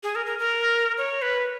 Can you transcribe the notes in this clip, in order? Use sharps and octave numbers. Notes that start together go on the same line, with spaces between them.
G#4
A#4
A#4
A#4
C#5
B4